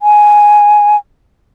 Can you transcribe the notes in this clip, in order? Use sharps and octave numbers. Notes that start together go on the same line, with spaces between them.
G#5